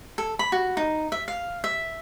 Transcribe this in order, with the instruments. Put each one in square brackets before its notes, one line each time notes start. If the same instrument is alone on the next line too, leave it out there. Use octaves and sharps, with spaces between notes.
[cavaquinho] A4
B5
F#4
D#4
E5
F5
E5